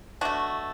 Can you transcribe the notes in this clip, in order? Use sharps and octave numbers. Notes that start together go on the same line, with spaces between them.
B2 A3 D4 F#4